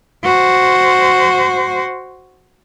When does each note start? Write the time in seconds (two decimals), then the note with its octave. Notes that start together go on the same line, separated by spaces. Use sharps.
0.24 F#4 C5